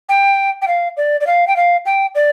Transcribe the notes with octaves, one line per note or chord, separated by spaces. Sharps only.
G5
G5
F5
D5
D5
F5
G5
F5
G5
D5